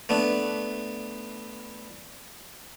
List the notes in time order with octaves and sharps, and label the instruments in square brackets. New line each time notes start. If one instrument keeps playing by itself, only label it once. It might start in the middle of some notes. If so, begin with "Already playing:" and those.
[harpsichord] A3 B3 D4